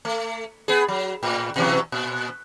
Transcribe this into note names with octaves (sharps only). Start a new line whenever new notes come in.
A3
B3 G#4
F#3
A2
B2 E3 F#3
A#2